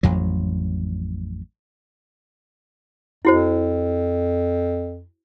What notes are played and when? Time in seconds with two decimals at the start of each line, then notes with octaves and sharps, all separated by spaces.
0.03 A1 F2 F#3
3.25 F2 E4 F#4 C5